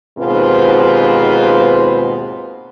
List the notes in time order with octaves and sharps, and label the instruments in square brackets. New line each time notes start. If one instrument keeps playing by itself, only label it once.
[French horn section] D#2 G#2 B2 C4 F4 B4